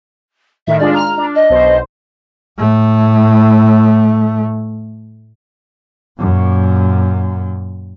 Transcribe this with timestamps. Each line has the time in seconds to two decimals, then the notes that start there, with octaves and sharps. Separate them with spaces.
0.67 A2 D#3 E5
0.79 G#3 D4 F4 D5
0.94 A#5 F6
1.18 D4
1.35 D#5
1.50 B1 B2 C5
2.59 A2 A3
6.19 F#2 A#2